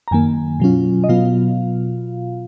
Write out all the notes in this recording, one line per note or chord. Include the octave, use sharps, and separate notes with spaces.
A#5
F#2 D#3 A#3 G#5
B2 F#3 C#4 F4
D#5
B2 F#3 B3 F4 F5